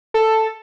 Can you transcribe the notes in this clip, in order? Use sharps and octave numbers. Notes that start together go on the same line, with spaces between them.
A4